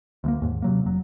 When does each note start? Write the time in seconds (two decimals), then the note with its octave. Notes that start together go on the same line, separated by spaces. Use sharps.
0.24 D2 G#3 A#3
0.42 D#2 G#2
0.62 C3 F#3 A#3
0.84 F1 F#3